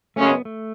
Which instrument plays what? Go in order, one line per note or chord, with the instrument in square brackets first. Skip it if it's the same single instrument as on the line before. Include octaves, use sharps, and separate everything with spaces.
[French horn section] F#2 C#3 G#3 C#4 [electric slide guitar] A3
[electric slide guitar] B3
A3